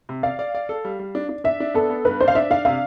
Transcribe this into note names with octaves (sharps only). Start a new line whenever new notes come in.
C3
D5 F5
D5
D5
A4
G3
G3
D4
D4
D4 E5
D4
B3 A4
B3
G2 B4
D4 C5
F5
D4 E5
D4 F5
C3 F5